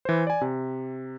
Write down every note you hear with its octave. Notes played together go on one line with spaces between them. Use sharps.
E3 C5
D5 G#5
C3